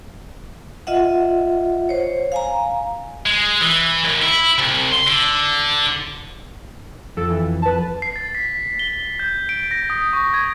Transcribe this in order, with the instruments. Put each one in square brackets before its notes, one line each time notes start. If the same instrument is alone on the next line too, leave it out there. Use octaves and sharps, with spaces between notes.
[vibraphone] F4 D#5 E5 F#5
C5 C#5
F5 G#5 A#5
[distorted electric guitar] G#3
E3
D#2
E4
C2
C6
D3
[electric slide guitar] F2 [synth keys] A4
[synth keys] E3
B4 A5
[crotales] C7
A6
B6
G7
G6
D7
A#6
D#6
C#6
G#6